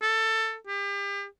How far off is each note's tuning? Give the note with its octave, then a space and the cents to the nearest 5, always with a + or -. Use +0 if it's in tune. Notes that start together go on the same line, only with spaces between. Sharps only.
A4 +15
G4 +35